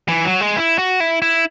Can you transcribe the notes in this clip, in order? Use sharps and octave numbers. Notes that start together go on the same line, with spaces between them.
E3
F#3
G#3
E4
F#4
E4
E4